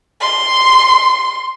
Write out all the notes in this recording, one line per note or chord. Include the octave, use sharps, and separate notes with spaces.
C6